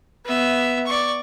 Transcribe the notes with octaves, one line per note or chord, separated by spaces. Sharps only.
B3 E5
D5 C#6